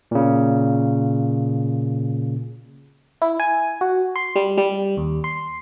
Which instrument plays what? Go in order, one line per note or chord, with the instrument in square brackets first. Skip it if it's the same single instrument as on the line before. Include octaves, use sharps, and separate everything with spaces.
[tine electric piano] A#2 C#3
[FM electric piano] E4
G#5
F#4
C6
G3
G3
D#2
C6